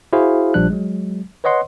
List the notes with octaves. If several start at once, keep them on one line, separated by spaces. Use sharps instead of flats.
E4 F#4 G#4 C5 F5
A#1 F3 G3 D4 F#6
F#3 G#3
B4 C#5 D#5 F#5 C6